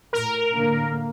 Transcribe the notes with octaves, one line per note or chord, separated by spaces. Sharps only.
A2 A#4
A2 D3 A#3